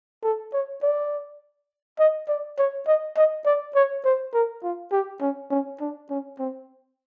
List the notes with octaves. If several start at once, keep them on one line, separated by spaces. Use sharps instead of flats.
A4
C#5
D5
D#5
D5
C#5
D#5
D#5
D5
C#5
C5
A#4
F4
G4
C#4
C#4
D4
C#4
C4